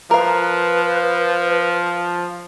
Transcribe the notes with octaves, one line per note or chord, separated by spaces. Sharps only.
F3 A#4 B4 F5